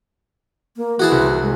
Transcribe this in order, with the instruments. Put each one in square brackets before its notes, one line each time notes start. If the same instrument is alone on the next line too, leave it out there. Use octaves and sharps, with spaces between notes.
[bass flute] A#3
[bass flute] E3 [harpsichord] F#4 G#4 A5
[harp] C2
[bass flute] G#3